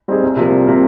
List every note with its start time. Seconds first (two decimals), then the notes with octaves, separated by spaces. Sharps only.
0.08 G3 C4 D#4 G#4
0.23 C2
0.37 C3 F3 A#3
0.52 C2
0.67 C3 F3 A#3